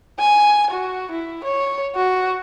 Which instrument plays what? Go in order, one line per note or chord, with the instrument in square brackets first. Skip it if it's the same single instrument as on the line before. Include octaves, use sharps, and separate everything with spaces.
[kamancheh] G#5
F#4
E4
C#5
F#4